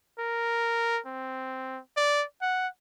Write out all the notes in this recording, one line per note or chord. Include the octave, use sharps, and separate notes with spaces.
A#4
C4
D5
F#5